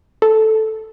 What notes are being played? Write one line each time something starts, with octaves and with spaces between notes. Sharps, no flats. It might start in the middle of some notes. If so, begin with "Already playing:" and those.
A4